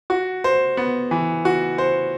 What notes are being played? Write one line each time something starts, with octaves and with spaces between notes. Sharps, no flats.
F#4
C5
B3
E3
F#4
C5